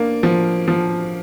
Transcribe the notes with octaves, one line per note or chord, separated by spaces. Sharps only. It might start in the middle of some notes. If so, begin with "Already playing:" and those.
Already playing: A#3 D4
F3
F3